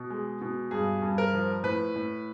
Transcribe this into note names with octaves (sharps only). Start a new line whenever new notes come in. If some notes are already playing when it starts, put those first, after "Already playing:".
Already playing: B2
G#3
B2
G2 G#4
G2
A#4
F3
A2 B4
A2